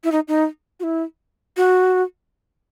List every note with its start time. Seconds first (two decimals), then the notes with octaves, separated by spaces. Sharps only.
0.04 E4
0.12 D#4
0.28 D#4
0.80 F#4
0.83 E4
1.57 F#4